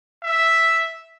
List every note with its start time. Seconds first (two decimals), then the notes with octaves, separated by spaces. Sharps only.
0.23 E5